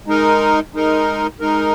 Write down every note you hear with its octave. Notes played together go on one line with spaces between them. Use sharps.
G#3 D#4 A#4
G#3 D#4 A#4
G#3 D#4 A#4